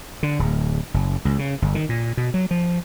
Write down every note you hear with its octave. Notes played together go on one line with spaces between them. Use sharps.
D3
D1
F#1
C#2
C#3
G1
D#3
A#2
B2
F#3
F3